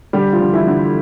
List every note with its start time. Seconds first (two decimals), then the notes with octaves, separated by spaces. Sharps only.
0.13 D3 G3 G4
0.33 F3 F4
0.40 D3
0.53 E3 E4
0.67 D3